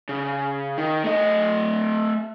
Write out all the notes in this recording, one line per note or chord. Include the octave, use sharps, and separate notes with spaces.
C#3
D#3
A3 D#5